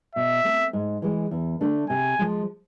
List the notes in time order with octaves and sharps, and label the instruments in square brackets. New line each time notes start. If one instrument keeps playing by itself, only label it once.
[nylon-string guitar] B2 [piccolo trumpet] E5
[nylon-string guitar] A3 C4
G#2
E3 G#3
E2
D3 A3 D4
[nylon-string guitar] C3 [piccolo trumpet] G#5
[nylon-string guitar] F3 G#3